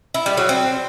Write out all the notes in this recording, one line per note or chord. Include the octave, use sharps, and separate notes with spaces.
E4
G3
F#3
C4